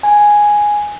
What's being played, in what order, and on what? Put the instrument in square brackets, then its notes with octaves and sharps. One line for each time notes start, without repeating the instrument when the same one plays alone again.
[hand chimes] G#5